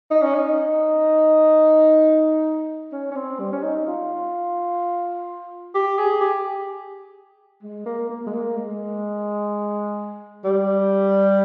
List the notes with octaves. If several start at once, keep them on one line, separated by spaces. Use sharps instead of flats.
D#4
C#4
D#4
C#4
C#4
C4
G3
C#4
D#4
F4
G4
G#4
G4
G#3
A#3
A#3
G#3
A#3
G#3
G3